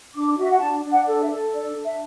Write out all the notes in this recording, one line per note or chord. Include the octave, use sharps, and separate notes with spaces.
D4 D6
F#4 E5
F#5
D4 A5
D4
F#5
A4
E5
A4
D4 D5
D4
E5